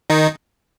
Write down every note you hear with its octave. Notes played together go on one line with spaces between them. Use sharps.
D#3 D#4